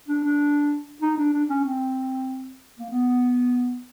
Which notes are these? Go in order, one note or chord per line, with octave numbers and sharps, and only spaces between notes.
D4
D4
D#4
D4
D4
C#4
C4
A#3
B3